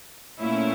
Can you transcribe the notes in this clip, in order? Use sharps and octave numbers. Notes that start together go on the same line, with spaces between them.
A#2 A3 C#4 E4